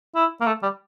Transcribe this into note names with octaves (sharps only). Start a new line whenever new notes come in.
E4
A#3
A3
G3